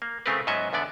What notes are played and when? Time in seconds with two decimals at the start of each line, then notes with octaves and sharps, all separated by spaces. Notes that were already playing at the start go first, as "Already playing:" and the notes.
0.02 A#3
0.26 C#3 A3 C4 G4 A#4 B4
0.47 G#2 F#3 B3 C#4 D#5 E5
0.73 E2 D3 B3 D5